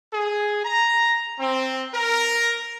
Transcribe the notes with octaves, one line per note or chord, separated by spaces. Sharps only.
G#4
A#5
C4
A#4